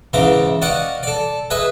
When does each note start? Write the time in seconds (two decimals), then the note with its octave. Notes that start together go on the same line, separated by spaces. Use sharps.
0.13 G#2 C#3 E3 A#5 D6
0.62 F#4 D5 D#5 F5 F#5
1.03 A4 D5
1.50 G#4 B4 D#5 E5